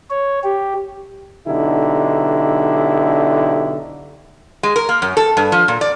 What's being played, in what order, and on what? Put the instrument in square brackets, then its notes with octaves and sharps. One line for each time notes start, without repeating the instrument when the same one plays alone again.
[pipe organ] C#5
G4
[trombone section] B1 D3 D#4 E4 G4
[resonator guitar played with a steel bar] G#3
A#4
A#3
F#2
A4
G2
F3
A#2
D5